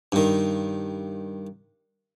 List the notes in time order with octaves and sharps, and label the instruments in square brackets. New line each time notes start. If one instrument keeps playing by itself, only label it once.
[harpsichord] G2 D#3